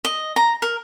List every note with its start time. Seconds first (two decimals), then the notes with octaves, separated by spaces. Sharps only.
0.05 D#5
0.36 A#5
0.62 A#4